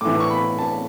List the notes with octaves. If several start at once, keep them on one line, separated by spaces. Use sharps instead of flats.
A2 E3 D6
D6
C#6
B5
A5